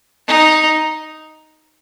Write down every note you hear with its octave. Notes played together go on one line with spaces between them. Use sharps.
D#4